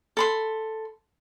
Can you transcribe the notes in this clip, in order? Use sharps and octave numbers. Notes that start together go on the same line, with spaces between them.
A4 B5 C6